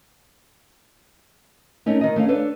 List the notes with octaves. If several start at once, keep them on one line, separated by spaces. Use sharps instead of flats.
A3 A#3 C#4 D#4
D#3 D#5
A3 C#4 E5 F5
D4 A4 B4 C#5